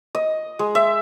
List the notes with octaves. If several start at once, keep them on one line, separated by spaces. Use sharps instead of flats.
D#5
G#3
E5